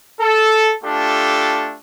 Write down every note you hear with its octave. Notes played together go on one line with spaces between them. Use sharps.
A4
A3 D4 F4 G4 A4